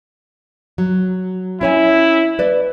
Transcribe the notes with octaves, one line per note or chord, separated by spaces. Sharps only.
F#3
C#4 E4 C#5 G#5
B4 D5